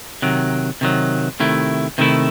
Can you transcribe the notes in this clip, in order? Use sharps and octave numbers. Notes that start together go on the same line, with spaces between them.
C3 D#3 F#3
C3 D#3 F#3
C3 D#3 A3 E4
C3 D#3 A3 E4